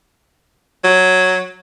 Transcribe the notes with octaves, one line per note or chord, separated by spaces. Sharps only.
F#3